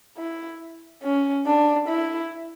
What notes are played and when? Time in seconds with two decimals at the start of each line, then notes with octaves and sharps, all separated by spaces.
0.17 E4
1.03 C#4
1.46 D4
1.89 E4